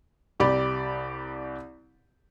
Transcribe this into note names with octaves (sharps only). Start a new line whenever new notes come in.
C2 G4 D5 B5 D6